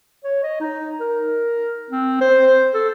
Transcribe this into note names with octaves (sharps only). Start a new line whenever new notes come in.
C#5
D#5
D#4
A#4
C4
C5
A4